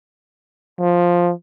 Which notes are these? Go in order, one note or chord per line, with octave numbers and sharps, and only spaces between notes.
F3